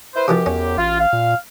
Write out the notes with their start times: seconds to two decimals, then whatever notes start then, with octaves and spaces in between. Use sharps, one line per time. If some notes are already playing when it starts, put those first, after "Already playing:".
0.15 E4 B4 C5
0.28 F#2 C3 E3 F3 G4
0.46 E2 C#4
0.77 A1 F4
0.99 F5
1.13 A#2